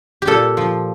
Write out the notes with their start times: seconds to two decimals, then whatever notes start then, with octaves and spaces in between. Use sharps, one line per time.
0.22 G4
0.27 A#2 A4
0.57 F3